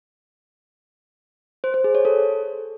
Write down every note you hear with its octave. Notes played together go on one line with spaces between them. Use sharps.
C5
C5
G#4
C#5
A4